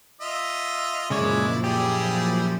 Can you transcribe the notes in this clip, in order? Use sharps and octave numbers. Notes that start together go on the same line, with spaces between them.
F4 D#5 E5
F#2 A#2 C#3 F3 G#3 E4 C#5 D5
G3 E4 G4 G#4